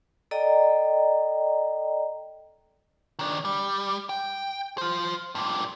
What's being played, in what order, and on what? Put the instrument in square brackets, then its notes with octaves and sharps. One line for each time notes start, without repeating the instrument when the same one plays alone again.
[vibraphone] A4 D5 D#5 G5 A#5
[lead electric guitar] D#3 D4
G3
G5
F4 C5
G2 A#2